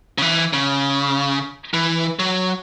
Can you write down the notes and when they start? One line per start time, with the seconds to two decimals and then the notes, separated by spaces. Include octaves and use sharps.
0.18 C#3
0.22 E3
0.53 C#3
1.74 E3
2.19 F#3